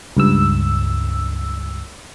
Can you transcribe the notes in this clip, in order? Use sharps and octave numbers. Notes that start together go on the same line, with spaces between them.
C#2 G2 E6